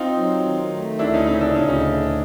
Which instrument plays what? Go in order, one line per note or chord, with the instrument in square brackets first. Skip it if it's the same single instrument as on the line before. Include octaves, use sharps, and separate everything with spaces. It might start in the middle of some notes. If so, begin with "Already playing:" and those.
Already playing: [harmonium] C4 [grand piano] D#4 F4
[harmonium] F#3
D#3
A3
[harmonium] D2 [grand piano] D4 E4
[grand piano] C#4 D#4
[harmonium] C#3 [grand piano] C#4 D#4
[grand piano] D4 E4
[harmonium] D2 [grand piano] C#4 D#4
[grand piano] C#4 D#4